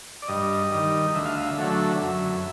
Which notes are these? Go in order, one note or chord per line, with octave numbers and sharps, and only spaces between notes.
D5
G2 D#5
D#3 G3
D2 E5
F5
E5
D3 F#3 A3
F#2